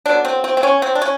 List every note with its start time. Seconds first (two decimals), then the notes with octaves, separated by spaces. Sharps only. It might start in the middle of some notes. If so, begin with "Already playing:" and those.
0.06 D3 F#3 B3 D4
0.25 C4
0.44 C4
0.57 C4
0.63 C#4
0.82 C4
0.95 D4
1.02 C#4